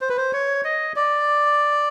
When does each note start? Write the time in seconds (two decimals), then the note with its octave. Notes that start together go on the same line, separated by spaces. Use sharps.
0.01 C5
0.09 B4
0.17 C5
0.33 C#5
0.64 D#5
0.96 D5